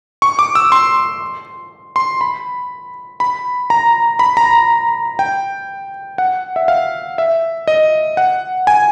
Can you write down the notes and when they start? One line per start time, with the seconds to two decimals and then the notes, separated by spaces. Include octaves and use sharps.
0.22 C#6
0.39 D6
0.55 E6
0.72 C6
1.96 C6
2.21 B5
3.20 B5
3.70 A#5
4.19 B5
4.37 A#5
5.19 G5
6.18 F#5
6.56 E5
6.68 F5
7.18 E5
7.68 D#5
8.17 F#5
8.67 G#5